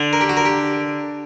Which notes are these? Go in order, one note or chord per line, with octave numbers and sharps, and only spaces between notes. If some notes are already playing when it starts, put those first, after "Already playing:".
Already playing: D3
A#4
G4
F#4
A#4
G4